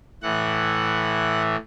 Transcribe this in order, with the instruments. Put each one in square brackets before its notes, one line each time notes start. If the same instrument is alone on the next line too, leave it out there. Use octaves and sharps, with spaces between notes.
[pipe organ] A2 E3 F#5